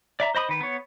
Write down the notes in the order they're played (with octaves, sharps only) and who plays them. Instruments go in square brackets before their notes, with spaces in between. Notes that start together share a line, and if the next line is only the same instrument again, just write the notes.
[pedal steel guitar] D5 E5 A#5
C5 D#5 B5 D#6
D#3 B4
B3 C#5